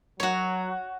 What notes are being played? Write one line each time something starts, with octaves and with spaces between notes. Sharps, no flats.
F#3 F#4 C#5